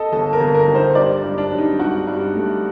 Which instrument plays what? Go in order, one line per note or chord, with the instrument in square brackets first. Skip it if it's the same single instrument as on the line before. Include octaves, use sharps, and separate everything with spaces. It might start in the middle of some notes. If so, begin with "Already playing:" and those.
Already playing: [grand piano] A4 D#5
[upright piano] G1 [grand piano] A4
[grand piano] A#4
[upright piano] G1
[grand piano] A#4
[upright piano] D#3
[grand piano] C5
[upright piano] G2 [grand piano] D5
[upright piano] G2
[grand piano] D4
[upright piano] F#3
[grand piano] D#4
[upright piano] G2 [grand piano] F#4
[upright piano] G2
A3